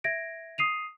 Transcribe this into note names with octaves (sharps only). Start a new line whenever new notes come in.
E5 G#6 A#6 D7
D#6 C7 D#7 F7